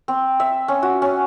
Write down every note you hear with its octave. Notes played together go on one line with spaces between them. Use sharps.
C4
E5
C#4
F#4
C#4